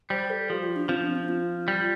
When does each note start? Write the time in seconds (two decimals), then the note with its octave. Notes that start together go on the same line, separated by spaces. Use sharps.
0.10 G3 C5
0.30 A4
0.50 F3 G4
0.63 F4
0.76 D4
0.89 F3 C4
1.02 D4
1.16 C4
1.29 F4
1.68 G3